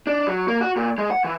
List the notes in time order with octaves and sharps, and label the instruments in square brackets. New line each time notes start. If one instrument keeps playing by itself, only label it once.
[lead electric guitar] D4
F#3
A#3
F#4
A#2
G#3
F#5
E3